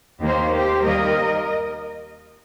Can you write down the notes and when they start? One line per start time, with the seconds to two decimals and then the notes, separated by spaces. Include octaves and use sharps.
0.22 D#2 D#3 A#3 G4 C5
0.54 G4 C5
0.84 D#2 D#3 G3 A#3 A#4 D#5